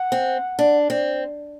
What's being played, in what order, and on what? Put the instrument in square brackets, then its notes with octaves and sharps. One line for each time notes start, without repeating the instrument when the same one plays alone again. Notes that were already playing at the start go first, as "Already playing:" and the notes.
Already playing: [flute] F#5
[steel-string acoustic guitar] C4
D4
C4